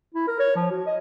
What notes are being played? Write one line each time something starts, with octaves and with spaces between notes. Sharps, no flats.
E4
A#4
C#5
F3
F#4
D#5